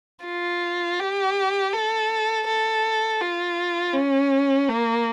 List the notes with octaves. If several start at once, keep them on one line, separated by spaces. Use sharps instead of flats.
F4
G4
A4
A4
F4
C#4
A#3